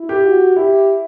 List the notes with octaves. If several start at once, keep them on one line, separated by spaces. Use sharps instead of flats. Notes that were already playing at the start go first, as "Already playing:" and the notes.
Already playing: E4
G4
F#4
E4 G4